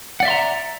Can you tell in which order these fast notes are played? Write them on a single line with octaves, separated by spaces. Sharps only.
F#5 D5 E5 C6 A#5